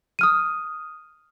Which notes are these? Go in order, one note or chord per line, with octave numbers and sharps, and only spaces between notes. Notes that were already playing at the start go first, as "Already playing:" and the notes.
D#6 F6 D#7